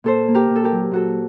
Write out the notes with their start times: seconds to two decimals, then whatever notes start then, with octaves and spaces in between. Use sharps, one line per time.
0.04 A#2 A4 C5
0.28 A#3
0.34 G4 A#4
0.50 A#2
0.56 A4
0.64 G4 A#4
0.72 F#3
0.91 A#2 F#4 A4